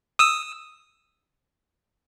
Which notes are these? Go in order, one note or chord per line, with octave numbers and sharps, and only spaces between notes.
D#6 E6